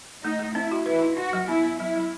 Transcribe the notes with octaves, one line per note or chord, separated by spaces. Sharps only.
A3 D#4
A3
C4 E4
F#4
E4 B4
D#4
D#4 F#4
F#3
B3 E4
B3
F#3 E4
F#3